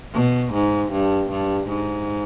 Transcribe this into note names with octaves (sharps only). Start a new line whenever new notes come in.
B2
G#2
G2
G2
G#2